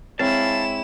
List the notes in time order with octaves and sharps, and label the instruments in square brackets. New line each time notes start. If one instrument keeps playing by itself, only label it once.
[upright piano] G#3 C#5 [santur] C4 [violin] E4 E7 [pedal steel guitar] F5 A5